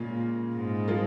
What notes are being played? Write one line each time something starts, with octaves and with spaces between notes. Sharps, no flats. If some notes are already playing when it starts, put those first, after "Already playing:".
Already playing: A#2 C#3 G#3 C#4 F4
G#2
F3 A#3 F4